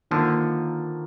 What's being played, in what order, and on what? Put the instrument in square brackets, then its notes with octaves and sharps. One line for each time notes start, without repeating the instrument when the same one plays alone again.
[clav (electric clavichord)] D3 F3 [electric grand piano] D#3 A#3 F4